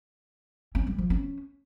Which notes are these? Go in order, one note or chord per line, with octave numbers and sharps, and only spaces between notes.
C#4
G3
F3
C#4